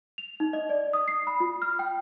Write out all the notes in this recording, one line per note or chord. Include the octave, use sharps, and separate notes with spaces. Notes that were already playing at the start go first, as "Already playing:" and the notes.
F7
D#4
D#5
D5
D#6
C7
B5
F4
F6
G5